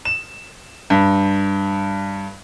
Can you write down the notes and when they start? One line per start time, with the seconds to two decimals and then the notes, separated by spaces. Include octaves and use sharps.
0.05 E7
0.90 G2